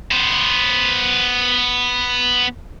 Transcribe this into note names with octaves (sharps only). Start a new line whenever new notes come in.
B3 C5